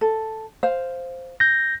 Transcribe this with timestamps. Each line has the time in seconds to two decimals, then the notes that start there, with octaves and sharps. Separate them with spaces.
0.01 A4
0.63 C5 F5
1.40 G6 A#6